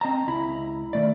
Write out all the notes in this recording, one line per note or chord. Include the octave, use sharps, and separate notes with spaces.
C4 D#5 A5 A#5
C#2 E4 B5
D#3 A3 D5